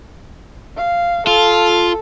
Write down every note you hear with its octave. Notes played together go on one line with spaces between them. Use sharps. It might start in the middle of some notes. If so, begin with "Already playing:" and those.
F5
F4 A4